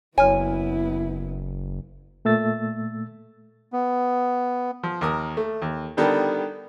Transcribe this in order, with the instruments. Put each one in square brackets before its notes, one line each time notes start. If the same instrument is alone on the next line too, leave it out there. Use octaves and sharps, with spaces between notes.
[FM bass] F#1 [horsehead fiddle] B3 E4 [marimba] C#5 F6 [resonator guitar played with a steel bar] G#5
[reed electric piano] A#2 A3 E6 A6
[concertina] B3
[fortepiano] F3
D#2 A#4 D#6
A3
D#2
D3 D#3 G3 B3 A4 A#4